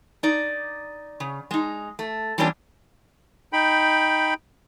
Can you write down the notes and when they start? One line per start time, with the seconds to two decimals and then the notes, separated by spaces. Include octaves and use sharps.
0.23 D#4 D5
1.20 C#3
1.51 G#3 D#4
1.99 A3
2.38 E3 G3 A#3 C#4 D4 F4
3.53 D#4 G5 B5